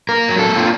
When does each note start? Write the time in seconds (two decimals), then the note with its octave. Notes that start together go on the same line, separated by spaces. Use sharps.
0.09 A#3 A#4
0.29 F#3
0.38 A4
0.48 A#3
0.56 F4